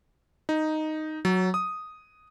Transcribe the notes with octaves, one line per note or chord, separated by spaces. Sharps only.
D#4
F#3
D#6